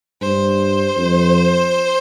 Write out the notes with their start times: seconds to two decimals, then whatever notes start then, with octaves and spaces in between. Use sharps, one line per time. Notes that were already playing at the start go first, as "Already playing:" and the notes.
0.21 G2 C5
0.97 F2